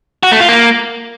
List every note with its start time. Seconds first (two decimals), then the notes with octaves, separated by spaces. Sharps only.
0.23 F#4
0.32 A3
0.40 F4
0.49 A#3